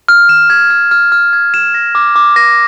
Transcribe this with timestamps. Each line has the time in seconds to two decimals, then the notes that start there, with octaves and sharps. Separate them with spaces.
0.08 F6
0.29 E7
0.50 G#6
0.70 F6
0.91 F6
1.12 F6
1.33 G#6
1.54 E7
1.74 A#6
1.95 D6
2.16 D6
2.36 A#6